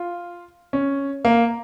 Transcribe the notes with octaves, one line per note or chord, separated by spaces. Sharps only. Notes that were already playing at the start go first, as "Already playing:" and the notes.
Already playing: F4
C#4
A#3